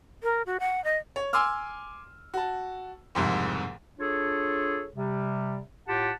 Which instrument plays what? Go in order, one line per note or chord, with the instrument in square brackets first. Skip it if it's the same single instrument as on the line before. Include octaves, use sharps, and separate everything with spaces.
[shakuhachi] A#4
F#4
F#5
D#5
[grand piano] C#5
G#5 C6 D6 E6 F6
F#4 A5
F#1 C2 F2 G#2
[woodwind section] D4 F4 G#4 A4 C#5
C3 G3
A2 F4 G4 F#5 A5